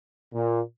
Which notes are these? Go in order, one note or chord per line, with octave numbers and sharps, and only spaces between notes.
A#2